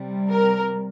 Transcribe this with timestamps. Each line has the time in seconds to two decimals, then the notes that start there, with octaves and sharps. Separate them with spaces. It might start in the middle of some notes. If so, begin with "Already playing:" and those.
Already playing: C3 G3
0.30 A#4